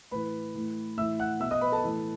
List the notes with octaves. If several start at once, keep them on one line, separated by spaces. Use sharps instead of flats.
A2 E3 B4 B5
A2 E3
A2 E3 E5 E6
F#5 F#6
B2 E5 E6
D#5 D#6
B4 B5
A4 A5
A2 E3